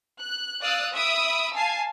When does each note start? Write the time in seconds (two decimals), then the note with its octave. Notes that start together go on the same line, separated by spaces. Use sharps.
0.21 F#6
0.62 D5 F5 D#6 E6 F#6
0.96 E5 B5 D#6 E6 D7
1.55 F5 G#5 A5 C7